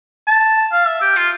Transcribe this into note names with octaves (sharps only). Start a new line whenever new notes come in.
A5
F5
E5
G4
F4